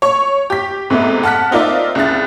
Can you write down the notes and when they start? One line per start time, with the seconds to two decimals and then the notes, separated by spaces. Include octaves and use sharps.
0.02 C#5 C#6
0.50 G4 B6
0.90 G#2 C3 A3 B3
1.23 F#5 A5 F6 F#6 B6
1.51 C4 D#4 F4 A#4 D5 E5
1.95 C2 C#3 E4 F#6 A6